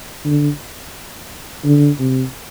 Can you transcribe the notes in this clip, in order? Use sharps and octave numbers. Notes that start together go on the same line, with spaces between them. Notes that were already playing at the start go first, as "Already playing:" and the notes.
D3
D3
C3